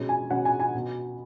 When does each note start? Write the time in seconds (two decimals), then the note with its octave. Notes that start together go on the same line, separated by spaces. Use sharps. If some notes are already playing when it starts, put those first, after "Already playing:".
Already playing: B2 G#3 C#4
0.09 G#5
0.30 B2 G#3 C#4 F#5
0.45 G#5
0.60 G#5
0.74 B2 B3